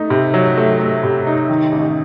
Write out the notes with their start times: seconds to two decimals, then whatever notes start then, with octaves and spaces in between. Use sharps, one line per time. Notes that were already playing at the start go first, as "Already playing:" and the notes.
Already playing: A3 D#4
0.10 C3
0.34 F#3
0.57 A3
0.79 A3
1.03 C3
1.27 D#4
1.49 D#3
1.72 A1